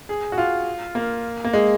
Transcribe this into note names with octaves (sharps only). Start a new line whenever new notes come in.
G#4
F#4
F4
A#3
A#3
G#3